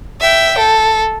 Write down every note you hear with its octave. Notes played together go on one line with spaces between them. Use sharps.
E5 G5
A4